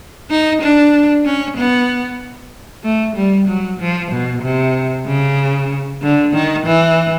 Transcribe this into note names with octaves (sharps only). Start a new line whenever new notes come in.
D#4
D4
C#4
B3
A3
G3
F#3
F3
B2
C3
C#3
D3
D#3
E3